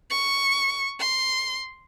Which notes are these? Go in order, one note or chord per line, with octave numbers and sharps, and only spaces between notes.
C#6
C6